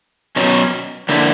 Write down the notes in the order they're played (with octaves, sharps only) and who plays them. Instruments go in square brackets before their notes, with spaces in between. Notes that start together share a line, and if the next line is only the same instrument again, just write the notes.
[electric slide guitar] B2 F#3 C#4
D3 A#3 E4